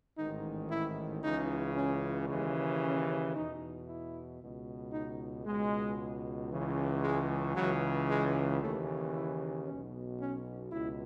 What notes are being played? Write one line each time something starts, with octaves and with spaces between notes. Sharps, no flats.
A1 G#2 D#3 D#4
E4
C#2 C#3 E3 D#4
C#4
D#2 C#3 E3 G#3
C#4
E2 B2 D#4
E4
C#2 B2
D#4
C#2 B2 G#3
C#2 C#3 E3
G#3
C#2 C#3 E3 F#3
G#3
D#2 C#3 E3 A3
E4
B1 B2 C#4
C#4
C#2 B2 E4